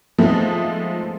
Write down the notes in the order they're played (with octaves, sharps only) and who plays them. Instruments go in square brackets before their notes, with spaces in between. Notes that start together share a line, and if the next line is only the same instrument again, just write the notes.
[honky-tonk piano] F3 G#3 A3 B3 C4 D#4